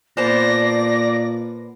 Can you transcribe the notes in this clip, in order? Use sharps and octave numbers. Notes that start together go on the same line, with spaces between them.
A#2 B3 C5 D5 A5 A#6